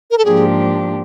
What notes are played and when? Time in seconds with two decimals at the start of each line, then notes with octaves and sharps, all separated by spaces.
0.11 A#4
0.18 A4
0.25 G#2 F3 A#3 D4 G4 G#4